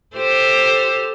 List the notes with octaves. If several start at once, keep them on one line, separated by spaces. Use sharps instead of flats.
G4 A4 C5